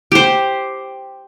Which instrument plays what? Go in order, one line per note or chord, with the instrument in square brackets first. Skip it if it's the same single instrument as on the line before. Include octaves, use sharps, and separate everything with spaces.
[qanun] G4 C5